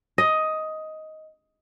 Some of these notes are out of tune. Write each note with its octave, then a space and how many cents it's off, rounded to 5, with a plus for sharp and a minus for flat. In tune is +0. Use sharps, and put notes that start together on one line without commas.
D#5 +10